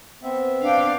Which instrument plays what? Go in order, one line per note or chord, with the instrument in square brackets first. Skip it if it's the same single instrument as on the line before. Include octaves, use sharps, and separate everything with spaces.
[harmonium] B3 C4 E5
[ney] D4 [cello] F5 G5